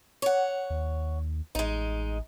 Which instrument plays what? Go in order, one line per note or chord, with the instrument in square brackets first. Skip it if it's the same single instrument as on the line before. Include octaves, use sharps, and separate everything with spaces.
[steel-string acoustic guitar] C#5 F#5
[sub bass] D#2
[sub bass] A1 [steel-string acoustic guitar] G#3 D#4